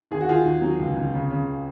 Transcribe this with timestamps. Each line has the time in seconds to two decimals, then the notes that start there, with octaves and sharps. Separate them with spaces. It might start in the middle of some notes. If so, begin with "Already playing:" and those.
0.11 D#2 G#4
0.21 F#4
0.28 D#3 F4 G#4
0.45 D#2
0.62 F#3
0.79 C#2
0.96 C#2
1.14 C#3
1.30 C#3